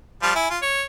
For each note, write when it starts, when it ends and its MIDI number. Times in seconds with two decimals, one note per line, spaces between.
0.23 0.32 53
0.23 0.32 55
0.23 0.32 65
0.35 0.48 64
0.35 0.48 80
0.50 0.59 65
0.62 0.83 73